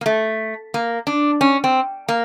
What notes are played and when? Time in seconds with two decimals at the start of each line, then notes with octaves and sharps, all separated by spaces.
0.01 A#3
0.06 A3
0.74 A#3
1.07 D4
1.41 C#4
1.64 C4
2.08 A#3